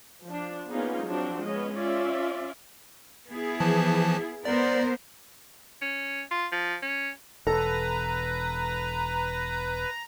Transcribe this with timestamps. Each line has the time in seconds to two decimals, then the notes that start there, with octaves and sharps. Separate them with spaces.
0.25 F3 D4
0.70 A#3 B3 C#4 D#4 F4 G#4
1.06 F3 F#3 C4 D4 F#4
1.45 G#3 B3 C#4 D#5
1.74 C#4 F4 D5 E5
3.30 B3 E4 G#4
3.60 E3 F3 A5
4.45 B3 A#4 C5 D5
5.81 C#4
6.31 F4
6.52 F3
6.82 C#4
7.47 E1 A4 B4 A#5